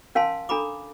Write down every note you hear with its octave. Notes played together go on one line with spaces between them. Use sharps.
C#4 A#4 F5 G#5 A5 C6
D4 A4 A#5 B5 D6